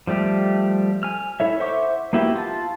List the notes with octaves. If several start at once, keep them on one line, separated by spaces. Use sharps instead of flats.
F3 G3 A3 G4
G#5 F6
E4 A4 C#5 E5
C5 E5 F#5 C#6 D6
A#3 B3 E4 F#4 G4
F4 A5